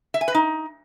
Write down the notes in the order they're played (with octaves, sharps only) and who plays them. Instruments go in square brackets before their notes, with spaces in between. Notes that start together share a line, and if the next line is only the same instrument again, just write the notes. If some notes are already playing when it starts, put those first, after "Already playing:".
[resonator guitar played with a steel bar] E5
G#5
B4
D#4